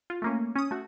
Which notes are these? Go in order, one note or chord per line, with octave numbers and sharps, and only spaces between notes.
F4
A3 A#3 C#4
C#4 D#6
A3 F#4